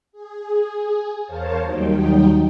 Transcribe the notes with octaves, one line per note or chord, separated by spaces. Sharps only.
G#4
E2 A#4 C5 C#5 F5 A5
D#2 F#3 G3 D#4 G5